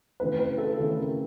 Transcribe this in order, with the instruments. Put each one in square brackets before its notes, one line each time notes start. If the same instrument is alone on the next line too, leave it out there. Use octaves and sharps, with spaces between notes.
[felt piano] C#3 E3 A3 C4 E4 [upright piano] B4
[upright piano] B4
A4
[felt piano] C#3 E3 A3 C4 E4 [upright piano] A4
[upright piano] A#4